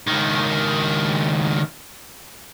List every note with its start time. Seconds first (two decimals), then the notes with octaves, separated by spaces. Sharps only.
0.07 C#2 D#3